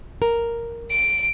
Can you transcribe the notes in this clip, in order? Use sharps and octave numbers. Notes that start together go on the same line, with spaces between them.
A#4
D7